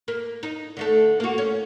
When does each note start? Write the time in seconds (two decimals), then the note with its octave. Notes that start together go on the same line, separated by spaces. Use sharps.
0.08 A#3
0.43 D#4
0.77 D3 A3 A4
1.20 A#3 F#4
1.38 C#4